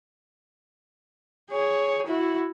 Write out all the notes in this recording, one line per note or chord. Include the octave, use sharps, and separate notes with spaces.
G#4 C#5
E4 F#4